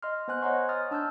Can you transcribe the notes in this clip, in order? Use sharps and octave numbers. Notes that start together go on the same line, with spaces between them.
D#5 C6 F6
B3 C5 G#5 F#6
C#5 D#5 F#5 A#5 C6 C#6
D#6 F6 A6
D4 A5 E6 F6 G6